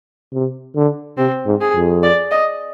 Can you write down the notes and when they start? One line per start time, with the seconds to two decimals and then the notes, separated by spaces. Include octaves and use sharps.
0.33 C3
0.75 D3
1.17 C3 C4
1.46 G#2
1.61 G#4
1.74 F2
2.03 D5
2.31 D#5